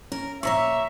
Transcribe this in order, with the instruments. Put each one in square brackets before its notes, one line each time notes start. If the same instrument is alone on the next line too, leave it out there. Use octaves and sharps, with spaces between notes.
[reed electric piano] C#4 [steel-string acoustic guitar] A#4
[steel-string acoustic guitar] A#2 C5 C#5 [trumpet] E5 [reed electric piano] A#5 C#6